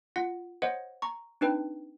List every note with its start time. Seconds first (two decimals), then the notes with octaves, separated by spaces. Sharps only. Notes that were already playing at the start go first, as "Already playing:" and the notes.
0.16 F4 F#5 A#6
0.62 C5 C#5 D#5 F#5
1.02 A#5 C#6
1.41 C4 D4 D#4 B4 G5